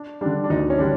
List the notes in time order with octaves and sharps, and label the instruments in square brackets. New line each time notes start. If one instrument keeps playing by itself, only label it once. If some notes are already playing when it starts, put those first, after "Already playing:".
Already playing: [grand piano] D4
[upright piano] D3 G3 [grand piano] D4
[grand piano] D4
[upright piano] D2 [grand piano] D#4
[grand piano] C#4
[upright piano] D3 G3 [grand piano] D4